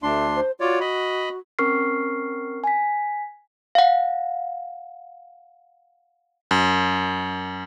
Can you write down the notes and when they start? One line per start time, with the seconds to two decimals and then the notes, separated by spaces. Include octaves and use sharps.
0.03 D2 A3 D4 C6
0.35 C5
0.60 F4 F#4 C#5 D5
0.81 D#5 B5
1.59 C4 C#4 A#4 C#6 F6 C7
2.64 G#5 B6
3.75 F5 F#5
6.51 F#2